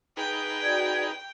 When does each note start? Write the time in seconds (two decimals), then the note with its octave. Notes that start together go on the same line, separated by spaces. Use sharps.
0.17 D#4 G#4 B4 G5
0.62 F#4 D5 G#6